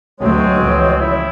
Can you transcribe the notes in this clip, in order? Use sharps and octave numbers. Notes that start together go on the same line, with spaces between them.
D2 B2 F#3 G#3 A3 C4 C#5
C#2 E3 F3
E4